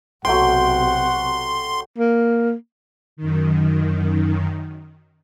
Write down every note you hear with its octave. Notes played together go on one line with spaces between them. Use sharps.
B1 C3 F#3 A3 F#5 G5 C6
A#3
F#2 D#3